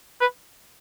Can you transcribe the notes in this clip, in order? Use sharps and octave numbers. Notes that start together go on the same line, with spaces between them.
B4